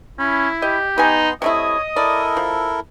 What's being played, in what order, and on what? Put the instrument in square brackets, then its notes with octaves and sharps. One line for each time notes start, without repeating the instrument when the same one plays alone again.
[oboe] C#4 [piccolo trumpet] E4 [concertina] B5
[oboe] G4 [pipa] D#5
[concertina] B3 C6 [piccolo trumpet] D#4 [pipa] B4 G#5
[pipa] C3 A3 E4 [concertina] C#5 [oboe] D#5 [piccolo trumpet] D#6
[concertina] E4 A4 A#4 [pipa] D5
[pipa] F3